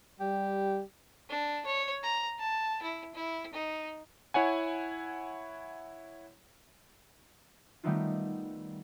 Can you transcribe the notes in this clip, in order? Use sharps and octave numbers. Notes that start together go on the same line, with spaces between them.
G3 G4
D4
C#5
A#5
A5
E4
E4
D#4
E4 C#5 F#5 G#5
D#3 G3 A3 B3 D#4 F4